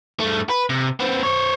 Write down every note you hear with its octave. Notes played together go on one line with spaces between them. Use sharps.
G2 A3
B4
C3
B3 C4
C5 C#5